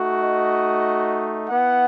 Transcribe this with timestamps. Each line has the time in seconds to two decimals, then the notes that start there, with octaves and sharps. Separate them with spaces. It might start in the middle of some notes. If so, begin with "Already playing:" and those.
Already playing: A3 D#4 F#4
0.22 D#5
1.50 B3 E4 F#5